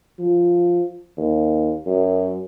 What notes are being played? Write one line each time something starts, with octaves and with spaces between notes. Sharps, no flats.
F3
D#2
F#2